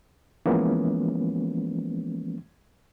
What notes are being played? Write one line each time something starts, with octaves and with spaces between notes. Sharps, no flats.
E3 F3 G#3 A#3 B3 C#4